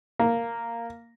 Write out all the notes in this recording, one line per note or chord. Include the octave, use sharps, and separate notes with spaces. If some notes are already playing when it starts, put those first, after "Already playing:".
A#3